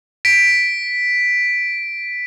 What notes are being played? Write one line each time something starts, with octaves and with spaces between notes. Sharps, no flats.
B6 D7